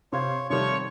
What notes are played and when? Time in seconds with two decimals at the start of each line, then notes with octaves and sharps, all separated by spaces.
0.13 C3 C5 C#5 F5 G#6
0.50 C3 D#3 F3 G3 A3 C#5 C#6